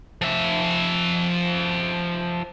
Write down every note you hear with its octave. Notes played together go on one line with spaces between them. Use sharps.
F3 E5